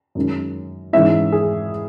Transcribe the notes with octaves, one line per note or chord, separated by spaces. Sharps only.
F#2 D#3 G#3 C#4
G#2 E3 G#3 C#4 E4 E5
G#4